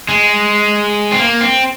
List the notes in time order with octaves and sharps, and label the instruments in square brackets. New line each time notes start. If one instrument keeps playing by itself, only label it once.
[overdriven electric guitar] G#3
C4
A#3
C4